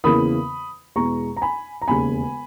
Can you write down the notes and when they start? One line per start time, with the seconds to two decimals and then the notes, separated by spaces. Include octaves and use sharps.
0.04 E2 C#3 E3 A#3 B5 D#6
0.96 E2 B2 G#3 A#5 C#6
1.37 A#5
1.42 G#5 B5
1.82 A#5
1.88 E1 D#2 C#3 G#5 B5